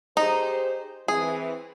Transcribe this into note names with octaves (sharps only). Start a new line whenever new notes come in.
D#4 G4 G#4 C5
E3 C4 G#4